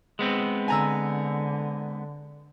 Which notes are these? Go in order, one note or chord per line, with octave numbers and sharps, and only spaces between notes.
G#3 B3 C4
D3 G#5 A#5 E6